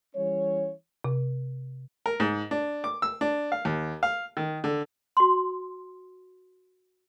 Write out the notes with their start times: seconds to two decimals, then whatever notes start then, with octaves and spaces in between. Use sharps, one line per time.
0.16 E3 G3 C#4 C#5
1.04 C3
2.06 A#4
2.20 G#2
2.51 D4
2.84 D6
3.02 E6
3.21 D4
3.52 F5
3.65 D#2
4.03 F5
4.37 D#3
4.64 D3
5.17 F#4 C6